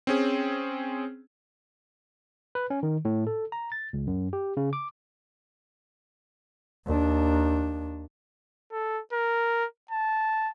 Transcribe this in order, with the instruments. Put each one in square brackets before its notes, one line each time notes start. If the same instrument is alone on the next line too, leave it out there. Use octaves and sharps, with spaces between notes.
[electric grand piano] C4 C#4 G#4
[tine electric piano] B4
C#4
D#3
A2
A4
A#5
A6
C#2
F#2
G4
C#3
D6
[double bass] D#2 D4
[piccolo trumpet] A4
A#4
A5